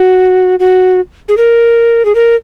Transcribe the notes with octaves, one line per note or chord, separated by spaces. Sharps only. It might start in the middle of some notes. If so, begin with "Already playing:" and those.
Already playing: F#4
F#4
G#4
A#4
G#4
A#4